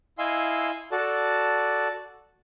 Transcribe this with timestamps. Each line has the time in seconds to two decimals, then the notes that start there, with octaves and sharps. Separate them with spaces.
0.18 E4 D#5 F5 G#5 C6 E6
0.92 F#4 A4 D5 A5